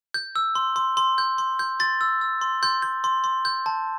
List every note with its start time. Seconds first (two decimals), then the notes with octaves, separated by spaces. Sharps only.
0.14 G6
0.36 E6
0.55 C6
0.76 C6
0.97 C6
1.18 G6
1.38 C6
1.59 G6
1.80 C6 A6
2.01 E6
2.21 E6
2.41 C6
2.63 C6 G6
2.82 G6
3.04 C6
3.24 C6
3.45 G6
3.66 A5